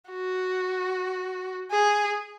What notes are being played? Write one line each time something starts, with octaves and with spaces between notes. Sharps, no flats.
F#4
G#4